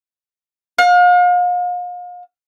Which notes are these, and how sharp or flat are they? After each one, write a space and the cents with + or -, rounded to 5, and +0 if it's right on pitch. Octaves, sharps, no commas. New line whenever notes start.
F5 +40